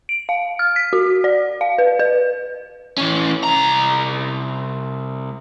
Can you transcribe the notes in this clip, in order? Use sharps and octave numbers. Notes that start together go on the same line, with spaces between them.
D7
F5
F6
B6
F#4
D5
F5
B4
B4
E3 C#4
C2 A#5